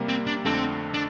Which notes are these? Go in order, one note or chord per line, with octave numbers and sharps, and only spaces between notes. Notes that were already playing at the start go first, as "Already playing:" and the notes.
Already playing: C3 G3 A#3
C4
D4
F2 D3 A3 C4 D4 A4
D4